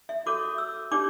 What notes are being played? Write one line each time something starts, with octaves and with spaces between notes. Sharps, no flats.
E5
F#4 A4 C#5 D6
E6
D4 G4 C#5 D6